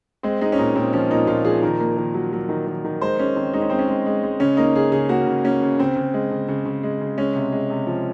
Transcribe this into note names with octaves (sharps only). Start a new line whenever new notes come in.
G#3 C4
G#3 D#4
C#4
A#2 D#4
A#2 C4
F3 C#4
A#2 D#4
A#2 F4
F3 G#4
D#3 A#4
A#3
D#3
F#3
F#3
D#3
D#3
D#3
G#3 C5
G#3 C#4
D#3 C4
G#3 D#4
C#4
G#3 C4
C#4
G#3
G#3
G#3
C#3 C#4
A#3 D#4
C#3 G#4
C#3 G#4
A#3 F#4
C#3
A#3 C#4
C#3
C#3 C4
C#3
G#3
C#3
C#3
C#3
G#3
C#3
G#3 C#4
C3
G#3
C3
F3